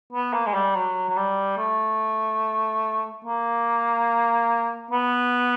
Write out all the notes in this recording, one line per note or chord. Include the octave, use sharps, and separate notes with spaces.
B3
A#3
G#3
G3
F#3
F#3
G3
A3
A#3
B3